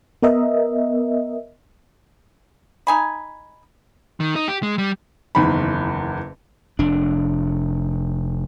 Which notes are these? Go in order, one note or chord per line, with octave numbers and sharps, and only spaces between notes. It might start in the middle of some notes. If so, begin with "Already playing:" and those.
B3 A#4 D#5 E5
D#4 G#5 B5
D#3
D#4
G4
G#3
G3
F#1 E2 D#3 B5
F1 D4